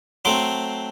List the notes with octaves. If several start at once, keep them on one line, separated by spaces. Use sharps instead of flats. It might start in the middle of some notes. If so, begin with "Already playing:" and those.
F#3 A3 C4 C6 D6